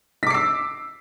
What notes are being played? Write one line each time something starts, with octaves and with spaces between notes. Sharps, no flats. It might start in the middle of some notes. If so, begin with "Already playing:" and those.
D6 E6 B6 C7